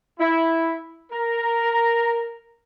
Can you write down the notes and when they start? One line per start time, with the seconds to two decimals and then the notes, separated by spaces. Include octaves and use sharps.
0.20 E4
1.12 A#4